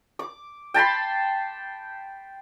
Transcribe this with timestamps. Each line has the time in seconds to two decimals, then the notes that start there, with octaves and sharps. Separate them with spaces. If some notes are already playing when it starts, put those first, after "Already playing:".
0.19 D6
0.74 G5 A5 B5 C6